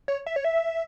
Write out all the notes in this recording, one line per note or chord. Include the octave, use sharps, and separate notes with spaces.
C#5
E5
C#5
E5